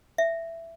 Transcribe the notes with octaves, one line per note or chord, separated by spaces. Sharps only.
E5